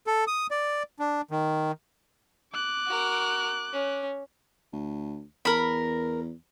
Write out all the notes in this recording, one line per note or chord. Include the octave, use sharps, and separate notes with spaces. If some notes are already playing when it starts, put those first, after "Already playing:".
A4
D#6
D5
D4
D#3
D6 F#6
F#4 A#4
C#4
D2
E2 A#4 B5